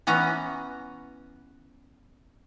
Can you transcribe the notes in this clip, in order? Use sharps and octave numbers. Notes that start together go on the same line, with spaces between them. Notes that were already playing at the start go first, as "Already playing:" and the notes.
E3 B3 C#4 A#5